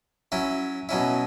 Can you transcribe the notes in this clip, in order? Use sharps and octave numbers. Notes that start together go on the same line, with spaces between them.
F#3 C#4 E4
B2 F#3 C#4 E4